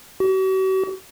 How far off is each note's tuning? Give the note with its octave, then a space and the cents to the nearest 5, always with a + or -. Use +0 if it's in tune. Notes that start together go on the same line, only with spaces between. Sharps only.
F#4 +45